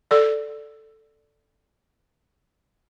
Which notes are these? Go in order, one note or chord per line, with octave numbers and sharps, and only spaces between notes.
A4 D5